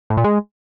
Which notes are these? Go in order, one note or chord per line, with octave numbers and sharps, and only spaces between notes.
A2
A#2
G#3